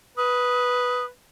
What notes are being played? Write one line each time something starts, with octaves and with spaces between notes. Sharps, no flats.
B4 D#6